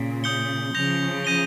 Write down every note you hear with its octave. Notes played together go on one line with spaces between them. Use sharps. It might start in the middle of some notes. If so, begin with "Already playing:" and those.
Already playing: A#2 C#3
D#6 G6 C#7 G7
C#3 F3 G6 A#6 F7
G6 A#6 D#7 G7